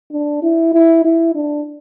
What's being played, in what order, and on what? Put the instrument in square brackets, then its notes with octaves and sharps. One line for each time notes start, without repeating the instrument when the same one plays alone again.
[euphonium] D4
E4
E4
E4
D4